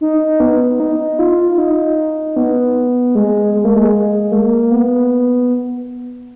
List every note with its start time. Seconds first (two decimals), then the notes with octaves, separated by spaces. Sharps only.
0.01 D#4
0.40 B3
0.80 D#4
1.19 F4
1.52 F4
1.58 D#4
2.36 B3
3.15 G#3
3.54 G#3
3.65 A#3
3.76 G#3
3.92 G#3
4.32 A#3
4.71 B3